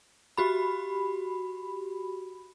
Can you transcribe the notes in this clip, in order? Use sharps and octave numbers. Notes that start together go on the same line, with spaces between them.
F#4 G4 B5